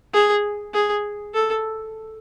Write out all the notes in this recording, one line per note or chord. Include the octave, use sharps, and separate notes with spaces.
G#4
G#4
A4